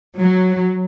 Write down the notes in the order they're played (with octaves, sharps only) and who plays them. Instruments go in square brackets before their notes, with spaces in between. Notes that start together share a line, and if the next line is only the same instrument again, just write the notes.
[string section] F#3